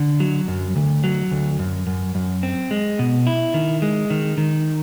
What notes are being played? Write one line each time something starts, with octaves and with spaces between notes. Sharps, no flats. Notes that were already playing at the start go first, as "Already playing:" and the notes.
Already playing: D3
F#3
F#2
D2
F#3
D2
F#2
F#2
F#2
C4
G#3
B2
E4
D#3
G#3
D#3
D#3